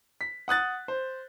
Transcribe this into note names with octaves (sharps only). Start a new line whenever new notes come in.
B6
F#5 D#6 F#6 A6
C5